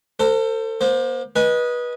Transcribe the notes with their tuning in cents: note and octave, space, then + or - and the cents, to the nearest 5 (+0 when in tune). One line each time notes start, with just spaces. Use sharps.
A4 +35 C5 +0
A#3 +40 C5 +0
B4 -25 D#5 +0 G#5 +0